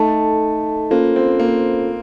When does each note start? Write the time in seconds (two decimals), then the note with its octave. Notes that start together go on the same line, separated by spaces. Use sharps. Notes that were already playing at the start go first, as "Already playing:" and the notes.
Already playing: A3 D#4 A4 D#5 A5
0.91 A#3 C#4 F4 A4 C5
1.16 C4
1.39 A#3